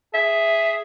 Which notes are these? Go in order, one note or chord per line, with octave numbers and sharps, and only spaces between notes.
G#4 E5